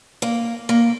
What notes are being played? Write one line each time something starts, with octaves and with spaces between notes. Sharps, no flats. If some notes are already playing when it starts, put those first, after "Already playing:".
A#3
A#3